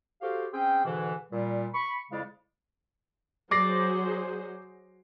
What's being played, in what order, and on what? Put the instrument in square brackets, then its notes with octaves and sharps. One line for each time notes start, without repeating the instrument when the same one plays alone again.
[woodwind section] F#4 G4 A4 C5 F5
C4 C#4 G#4 G5
G#2 B2 D3 E3
A#2 G3
B5 C#6
F2 C#3 G#3 E4 D5 F5
[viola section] F#3 G#4 C5 [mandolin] D5 [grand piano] D6 A#6 C7